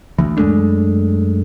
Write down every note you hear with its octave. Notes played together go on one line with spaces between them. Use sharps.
D2 E3
F#2 G#3 A3 D4